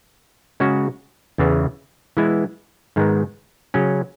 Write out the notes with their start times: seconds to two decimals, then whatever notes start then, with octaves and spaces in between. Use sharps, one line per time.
0.60 C#3 G#3 C#4 F#4
1.38 E2 C#3 E3 B3
2.17 E3 G#3 B3 E4
2.96 G#2 D#3 G#3 B3
3.74 C#3 F#3 C#4